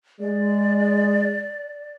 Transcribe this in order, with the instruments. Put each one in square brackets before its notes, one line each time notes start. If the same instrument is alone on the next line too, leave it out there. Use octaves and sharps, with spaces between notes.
[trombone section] G#3 [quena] D5